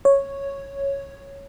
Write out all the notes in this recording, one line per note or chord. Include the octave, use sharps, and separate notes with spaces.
C#5